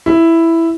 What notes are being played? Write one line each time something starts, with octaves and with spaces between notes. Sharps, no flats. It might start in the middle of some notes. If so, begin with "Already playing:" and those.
E4